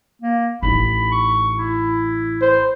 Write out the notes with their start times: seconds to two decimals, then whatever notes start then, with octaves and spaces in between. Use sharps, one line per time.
0.22 A#3
0.63 A1 D#4 B5
1.12 C#6
1.55 E4
2.42 C5